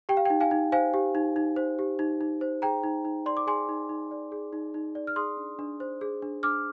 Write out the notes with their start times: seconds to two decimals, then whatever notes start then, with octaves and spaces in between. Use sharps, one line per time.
0.09 G4 G5
0.17 F5
0.26 D#4 G5
0.40 F5 G#5
0.51 D#4
0.72 C5 F5 G#5
0.94 G4
1.15 D#4
1.36 D#4
1.56 C5
1.79 G4
1.99 D#4
2.21 D#4
2.41 C5
2.62 G#4 G5 A#5
2.83 D#4
3.05 D#4
3.26 D5 C6
3.37 D6
3.47 G#4 G#5 C6
3.69 D#4
3.89 D#4
4.11 D5
4.32 G#4
4.53 D#4
4.74 D#4
4.95 D5
5.07 F6
5.16 G#4 C6 D#6
5.37 D4
5.59 D4
5.80 C5
6.01 G#4
6.22 D4
6.43 D4 D6 F6